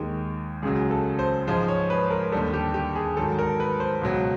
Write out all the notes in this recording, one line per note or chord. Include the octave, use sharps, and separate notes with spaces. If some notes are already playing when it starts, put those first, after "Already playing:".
Already playing: D#2 D#3 G#3 G4
C#2 C#3 F#3 G#4
A4
C5
G#2 F3 G#3 C5
C#5
B4
A#4
D#2 D3 G3 A4
G4
G4
G#4
G#2 D#3 F#3 A4
A#4
B4
C5
C#2 B2 F#3